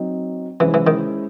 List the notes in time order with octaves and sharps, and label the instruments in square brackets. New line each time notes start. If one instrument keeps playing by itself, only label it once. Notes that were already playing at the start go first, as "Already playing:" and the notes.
Already playing: [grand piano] F#3 C4 D#4
[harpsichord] E3 [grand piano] G#3 C#4 E4 G#4 C5
[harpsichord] E3
D#3